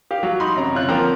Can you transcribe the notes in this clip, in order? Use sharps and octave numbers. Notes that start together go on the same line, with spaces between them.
G4 F5
F#3
D#4 B5 C6
F#2 C3 C#5 A#5
C#3 F4 C#5 F#6
D3 F3 A#3 C4 G5 A#5